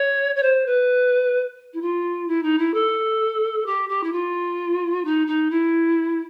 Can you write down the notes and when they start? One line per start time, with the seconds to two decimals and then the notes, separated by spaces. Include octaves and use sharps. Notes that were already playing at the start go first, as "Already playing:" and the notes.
Already playing: C#5
0.35 C#5
0.42 C5
0.66 B4
1.73 E4
1.81 F4
2.27 E4
2.42 D#4
2.58 E4
2.74 A4
3.66 G4
3.89 G4
4.03 E4
4.12 F4
5.04 D#4
5.27 D#4
5.50 E4